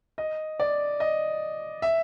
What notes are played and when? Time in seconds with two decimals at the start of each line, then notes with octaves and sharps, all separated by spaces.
0.18 D#5
0.60 D5
1.00 D#5
1.82 E5